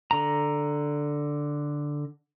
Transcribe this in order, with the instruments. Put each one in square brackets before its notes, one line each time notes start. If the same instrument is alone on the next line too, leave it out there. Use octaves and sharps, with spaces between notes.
[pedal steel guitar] D3 A#5